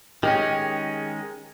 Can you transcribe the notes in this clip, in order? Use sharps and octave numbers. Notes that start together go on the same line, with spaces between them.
D#3 G#3 C#4 G4